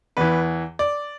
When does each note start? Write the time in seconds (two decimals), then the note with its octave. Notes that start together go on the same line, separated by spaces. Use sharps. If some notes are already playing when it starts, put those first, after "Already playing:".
0.17 E2 E3 B4
0.79 D5